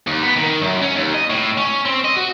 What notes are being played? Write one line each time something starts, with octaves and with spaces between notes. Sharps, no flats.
D#2
B3
D#3
F#2
C#4
D#2
D#5
A2
C#4
C4
D#5
F#4